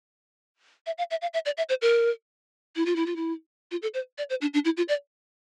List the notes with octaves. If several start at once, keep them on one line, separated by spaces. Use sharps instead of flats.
E5
F5
E5
F5
E5
D5
E5
C5
A#4
E4
F4
E4
F4
E4
F4
A4
C5
D5
C5
D4
D4
E4
F4
D5